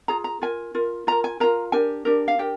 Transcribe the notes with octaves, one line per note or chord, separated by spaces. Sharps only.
F4 G#4 A#5
A#5
F4 A#4 G#5
F4 A#4
F4 A#4 A#5
G#5
F4 A#4 A#5
D4 G4 A#4 G#5
D4 G4 A#4
F5
D4 G4 A#4 G5